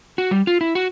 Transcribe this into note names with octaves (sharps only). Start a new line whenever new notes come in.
F#4
G3
F4
E4
F#4